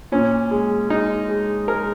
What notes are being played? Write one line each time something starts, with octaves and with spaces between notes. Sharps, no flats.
A#2 C#4
G#3
G#3 D#4
G#3
G#3 A#4